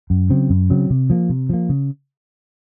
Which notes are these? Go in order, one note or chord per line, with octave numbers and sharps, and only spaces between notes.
F#2
C#3 F#3 C4
F#2
C#3 F#3 C4
C3
F3 A#3
C3
F3 A#3
C#3